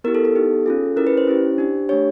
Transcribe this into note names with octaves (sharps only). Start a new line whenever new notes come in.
B3 E4 G4 A#4
A4
A4
B3 D#4 G4
C#4 F4 G#4
C#4 E4 G#4 A#4
B4
C5
C#4 E4 G4
D4 G4
A3 D4 G4 C#5